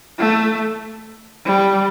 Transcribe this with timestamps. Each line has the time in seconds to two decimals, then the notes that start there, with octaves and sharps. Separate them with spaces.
0.19 A3
1.46 G3